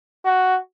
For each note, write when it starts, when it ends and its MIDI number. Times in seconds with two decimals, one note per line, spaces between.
0.25 0.57 66